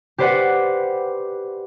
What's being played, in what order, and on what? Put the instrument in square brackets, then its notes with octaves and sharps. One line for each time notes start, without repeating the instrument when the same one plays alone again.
[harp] G4 B4 C5 D5 F#5